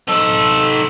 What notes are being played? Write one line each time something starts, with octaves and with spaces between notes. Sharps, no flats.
D#4 A4 E6